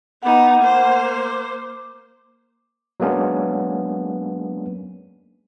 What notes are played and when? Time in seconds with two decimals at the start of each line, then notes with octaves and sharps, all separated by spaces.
0.23 B3 D#4 F#5 B5 D6
0.60 A#3 C5
1.22 D6
3.00 F#3 G#3 A#3 B3 C#4 D4